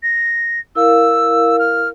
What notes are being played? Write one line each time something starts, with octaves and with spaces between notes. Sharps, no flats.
A#6
E4 A#4 F5 E6
F6